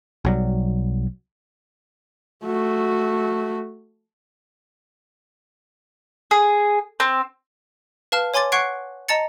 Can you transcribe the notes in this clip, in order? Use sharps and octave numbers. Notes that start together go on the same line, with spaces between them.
B1 F#3 G3
A3 F#4
G#4
C4
B4 F5 A5 F6
C#5 G#5 C6 D6 A6
F#5 C#6 F#6 G#6 C7 D7
D#5 A5 A#5 A6 C#7